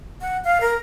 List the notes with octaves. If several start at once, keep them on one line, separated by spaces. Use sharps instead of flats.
F#5
F5
A#4